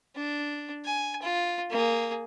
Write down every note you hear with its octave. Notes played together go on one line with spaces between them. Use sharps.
D4
G#5
F4
A#3 G#4